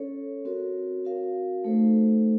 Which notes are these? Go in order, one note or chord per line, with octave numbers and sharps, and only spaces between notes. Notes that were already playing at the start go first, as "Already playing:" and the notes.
Already playing: C#4 A4 C#5
C4 F#4 A#4 C#5
C4 F#4 A#4 F5
A3 D#4 A4 C5